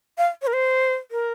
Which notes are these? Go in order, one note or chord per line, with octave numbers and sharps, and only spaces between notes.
F5
C#5
A#4
C5
A#4